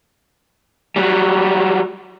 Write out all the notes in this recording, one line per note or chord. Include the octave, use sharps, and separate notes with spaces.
F#3 G3